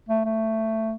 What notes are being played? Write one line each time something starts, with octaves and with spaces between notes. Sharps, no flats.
A3
A3